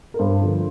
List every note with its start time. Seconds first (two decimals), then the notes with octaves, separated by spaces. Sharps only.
0.14 A#4
0.19 G2 C5
0.41 D3 F3